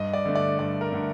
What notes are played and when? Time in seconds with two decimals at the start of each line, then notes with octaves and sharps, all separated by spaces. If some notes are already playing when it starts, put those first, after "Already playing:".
Already playing: G2 D#5
0.13 D5
0.25 D3 A3
0.35 D5
0.59 G2 D5
0.81 A#4
0.92 D3 A3